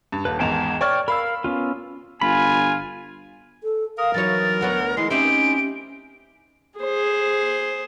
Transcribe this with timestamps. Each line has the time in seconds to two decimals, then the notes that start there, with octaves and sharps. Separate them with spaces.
0.12 G2
0.25 D#1 B4 A5
0.39 G#1 E2 G#2 G5 A5 A#5
0.81 C#5 D5 G5 C#6 F6
1.08 A#4 F5 B5 E6
1.44 B3 C#4 F4
2.21 G1 F4 G#5 B5
3.63 A4
3.98 A#4 F5 D#6
4.14 E3 F#3 D#4 C#5 A6
4.61 D2 B3 C#5 F#5
4.97 E3 G#3 E4 C7
5.10 C4 C#4 D#4 E4 G4 D7
6.79 G#4 C5